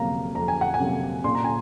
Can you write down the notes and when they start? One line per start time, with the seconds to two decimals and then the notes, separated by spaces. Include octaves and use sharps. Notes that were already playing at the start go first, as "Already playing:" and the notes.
Already playing: F2 C3 F#3 A#3 A#5
0.35 F2 A#5
0.48 G#5
0.61 F#5
0.74 G#5
0.79 C3 F#3 A#3
1.24 A#2 C6
1.35 A#5
1.44 G#5